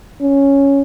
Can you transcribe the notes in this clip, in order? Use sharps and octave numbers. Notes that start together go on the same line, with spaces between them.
C#4